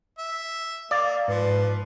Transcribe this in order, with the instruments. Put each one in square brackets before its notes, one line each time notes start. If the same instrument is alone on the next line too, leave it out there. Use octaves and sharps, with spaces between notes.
[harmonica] E5
[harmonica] A#3 [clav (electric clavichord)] D5 [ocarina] F5
[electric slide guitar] G#2 [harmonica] F3 [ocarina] B4